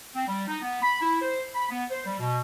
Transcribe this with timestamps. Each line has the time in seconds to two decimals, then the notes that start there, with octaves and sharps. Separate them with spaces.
0.15 C4
0.28 G3
0.48 D#4
0.62 B3
0.83 B5
1.02 E4
1.22 C5
1.55 B5
1.70 B3
1.91 C5
2.06 G3
2.20 B2